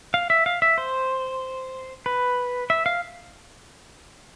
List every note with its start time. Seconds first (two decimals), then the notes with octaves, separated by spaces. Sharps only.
0.14 F5
0.30 E5
0.46 F5
0.62 E5
0.78 C5
2.06 B4
2.70 E5
2.86 F5